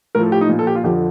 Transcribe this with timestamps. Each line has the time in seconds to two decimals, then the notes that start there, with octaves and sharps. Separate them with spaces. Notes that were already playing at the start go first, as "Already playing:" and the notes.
0.15 A2 F3 A#4
0.23 A4
0.32 G4
0.41 D#4
0.49 A#2 F3
0.59 A4
0.67 G4
0.75 F4
0.84 F2 D3 F3 G4